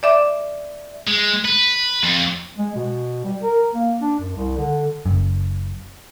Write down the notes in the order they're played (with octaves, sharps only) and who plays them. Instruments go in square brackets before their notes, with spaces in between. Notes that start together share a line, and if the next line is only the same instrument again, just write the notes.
[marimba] D5 E5 D6
[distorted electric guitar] G#3
B4
F2
[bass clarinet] G#3
B2
G3
A#4
A#3
D4
F#2
C2
D3
[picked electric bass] F#1 F#2